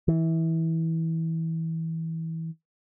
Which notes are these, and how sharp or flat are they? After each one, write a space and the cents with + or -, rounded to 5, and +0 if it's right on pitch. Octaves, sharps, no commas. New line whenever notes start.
E3 -20